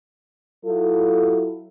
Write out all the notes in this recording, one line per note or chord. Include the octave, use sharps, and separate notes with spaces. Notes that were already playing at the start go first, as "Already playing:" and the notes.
F#3 E4 F4 A4